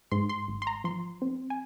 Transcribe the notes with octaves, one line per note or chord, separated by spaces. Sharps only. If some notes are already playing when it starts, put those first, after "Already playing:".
G#2 C6
C6
G#1
C6
A#5
F3 C6
C4
G#5